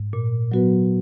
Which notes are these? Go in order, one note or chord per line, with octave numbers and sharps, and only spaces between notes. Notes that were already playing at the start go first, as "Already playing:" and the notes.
Already playing: G#2
A#2
F#3 B3 F#4 B4